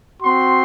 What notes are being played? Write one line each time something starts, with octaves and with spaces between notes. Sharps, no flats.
C4 F#4 C6